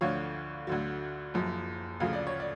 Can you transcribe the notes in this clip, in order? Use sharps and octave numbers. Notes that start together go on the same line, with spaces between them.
D2 D3 F3 C#5 F5
D2 D3 F#3
F#1 F#2 F3
D2 C#3 F3 F5
D5
C#5
D5